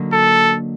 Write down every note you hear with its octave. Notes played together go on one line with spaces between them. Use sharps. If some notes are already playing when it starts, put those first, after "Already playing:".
Already playing: D3 F#3 A#3 D#4
A4